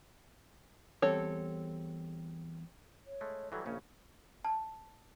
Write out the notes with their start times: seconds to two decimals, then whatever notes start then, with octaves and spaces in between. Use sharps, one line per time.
1.02 E2 G3 C4 A4 C#5
3.06 C#5
3.21 G#3 A3
3.52 E3 F#3 G3 A4
3.66 A#1 C#3 A#3 C#4
4.45 A5